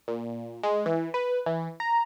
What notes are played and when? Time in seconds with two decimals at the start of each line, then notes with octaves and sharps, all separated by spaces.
0.08 A#2
0.63 G#3
0.86 E3
1.14 B4
1.46 E3
1.80 A#5